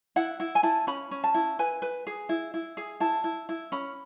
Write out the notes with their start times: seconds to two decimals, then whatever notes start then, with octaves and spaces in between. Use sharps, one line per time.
0.16 E4 F#5
0.40 E4
0.55 G#5
0.63 E4 A5
0.87 C#4 B5
1.11 C#4
1.24 A5
1.34 E4
1.59 B4 G#5
1.82 B4
2.07 G#4
2.29 E4
2.54 E4
2.77 G#4
3.00 E4 A5
3.24 E4
3.49 E4
3.72 C#4 B5